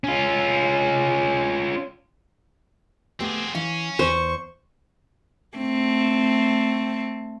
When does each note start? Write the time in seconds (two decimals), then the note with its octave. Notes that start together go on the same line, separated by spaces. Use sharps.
0.04 C#4 F4
3.20 A3 B3 C4 G4 G#4
3.55 E3 C#4 F5
3.99 E2 C5 C#6
5.57 A3 C4